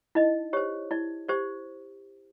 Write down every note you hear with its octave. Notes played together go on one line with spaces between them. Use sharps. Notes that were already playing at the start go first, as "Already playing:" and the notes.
D#4 E4 D#5
G4 C5 C#5
E4 D5
G4 C5 D5